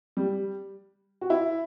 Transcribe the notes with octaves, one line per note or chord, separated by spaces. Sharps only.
G3
F#4
E4